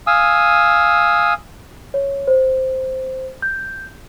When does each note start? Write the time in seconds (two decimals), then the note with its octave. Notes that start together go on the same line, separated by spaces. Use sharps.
0.07 F5 G#5 D#6 E6
1.94 C#5
2.27 C5
3.42 G6